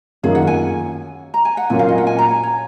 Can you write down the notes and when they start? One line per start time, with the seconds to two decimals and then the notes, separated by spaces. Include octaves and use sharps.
0.23 F#2 D#3 A#3 C#4 F4 G#4
0.35 F#5
0.47 G#5
1.34 A#5
1.45 G#5
1.57 F#5
1.70 A#2 F#3 A#3 C#4 G#5
1.79 F5
1.89 D#5
1.98 F#5
2.07 G#5
2.19 A#5
2.31 G#5
2.43 C#5